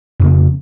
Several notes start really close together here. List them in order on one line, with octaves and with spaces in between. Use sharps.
F2 C#3 A#3